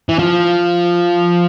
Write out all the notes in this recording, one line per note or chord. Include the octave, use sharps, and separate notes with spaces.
E3
F3